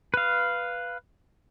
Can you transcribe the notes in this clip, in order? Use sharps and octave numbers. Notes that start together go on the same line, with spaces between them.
B4 F5